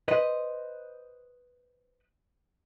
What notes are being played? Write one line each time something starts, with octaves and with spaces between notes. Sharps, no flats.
B4 C5 D#5